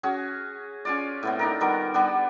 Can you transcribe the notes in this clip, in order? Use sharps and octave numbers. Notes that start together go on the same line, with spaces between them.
C#4 F#4 G#4
C#4 F4 D5
A2 B3 C4
D4 D#4 A#4
D#3 G3 B3 A#4
G3 B3 D4